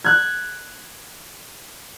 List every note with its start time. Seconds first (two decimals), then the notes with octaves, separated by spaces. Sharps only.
0.04 F#6 G#6